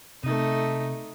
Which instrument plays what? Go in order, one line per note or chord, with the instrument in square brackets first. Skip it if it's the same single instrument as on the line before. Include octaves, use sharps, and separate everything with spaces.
[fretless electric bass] C3 [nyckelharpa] A3 D#4